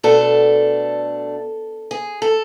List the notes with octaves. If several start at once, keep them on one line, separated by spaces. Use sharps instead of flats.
B2 A3 D4 A4
G#4
A4